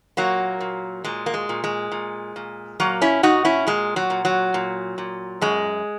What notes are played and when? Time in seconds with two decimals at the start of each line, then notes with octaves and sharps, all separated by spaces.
0.17 A#2 F#3 A#3
0.61 A#2
1.04 A#2 G#3
1.26 A#3
1.34 G#3
1.49 A#2
1.64 G#3
1.92 A#2
2.36 A#2
2.80 A#2 F#3 A#3
3.02 C#4 E4
3.23 A#2 D#4 F#4
3.45 C#4 E4
3.67 A#2 G#3
3.96 F#3
4.10 A#2
4.25 F#3
4.54 A#2
4.98 A#2
5.41 F#2 G#3